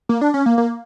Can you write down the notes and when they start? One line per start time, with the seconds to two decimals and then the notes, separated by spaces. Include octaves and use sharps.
0.09 A#3
0.21 D4
0.34 C#4
0.46 A#3
0.58 A#3